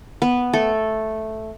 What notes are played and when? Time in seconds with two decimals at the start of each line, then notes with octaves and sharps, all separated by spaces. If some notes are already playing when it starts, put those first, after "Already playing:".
0.22 B3 B4
0.53 A3 A4